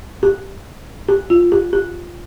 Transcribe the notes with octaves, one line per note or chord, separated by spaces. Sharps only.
G4
G4
F4
G4
G4